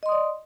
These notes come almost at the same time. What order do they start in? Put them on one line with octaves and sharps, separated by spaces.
D#5 C6 D#6 D5